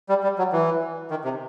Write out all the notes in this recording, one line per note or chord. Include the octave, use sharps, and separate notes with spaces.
G3
G3
F#3
E3
D#3
C3